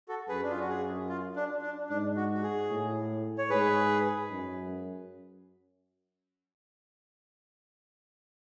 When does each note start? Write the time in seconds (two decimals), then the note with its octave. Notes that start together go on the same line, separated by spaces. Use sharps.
0.09 F#4 A4
0.29 F#2 G#4 B4
0.43 D4
0.51 F4
0.60 F#4
0.69 G#4
1.09 F4
1.36 D4
1.62 D4
1.90 G#2 D4
2.16 F#4
2.35 F#4
2.43 G#4
2.70 A2
3.38 C#5
3.50 G#2 G#4 B4
4.30 F#2